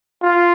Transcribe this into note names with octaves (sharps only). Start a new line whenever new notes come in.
F4